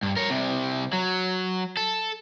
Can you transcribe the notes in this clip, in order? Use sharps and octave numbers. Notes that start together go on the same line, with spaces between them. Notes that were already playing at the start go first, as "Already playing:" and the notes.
G2
A#4 C#5
C2 C3
F#3
A4